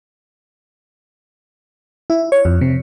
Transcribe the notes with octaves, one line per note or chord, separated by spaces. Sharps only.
E4
C#5
F2
C3